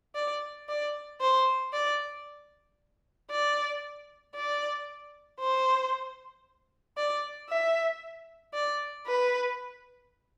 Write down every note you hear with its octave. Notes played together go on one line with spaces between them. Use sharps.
D5
D5
C5
D5
D5
D5
C5
D5
E5
D5
B4